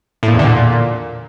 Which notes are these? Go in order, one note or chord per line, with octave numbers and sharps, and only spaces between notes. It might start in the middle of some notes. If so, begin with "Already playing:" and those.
A2
A#2
E2
D3
A#2